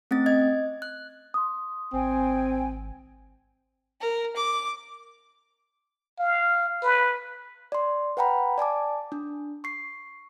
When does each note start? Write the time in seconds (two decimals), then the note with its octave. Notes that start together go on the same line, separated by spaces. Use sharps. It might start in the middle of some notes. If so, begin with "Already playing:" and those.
0.11 A3 C4 C#4 A6
0.26 D#5 G#6
0.82 F#6
1.34 C6 D#6
1.93 G#1 C4 G5 G#5
4.01 A#4
4.36 D6
6.19 F5
6.83 B4
7.72 D5 C6
8.17 B4 F#5 G5 A#5 B5
8.58 D5 G#5 A5 D6
9.12 D4
9.64 C#6 C7